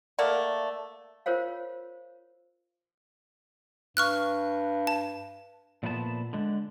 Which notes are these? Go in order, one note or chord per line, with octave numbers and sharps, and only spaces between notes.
A3 A#3 D5 F#5
F4 A#4 C5 C#5 F5
G2 C#6 F6 F#6
A5
A#2 F3 A3 B3 A4 A5
D3 G#3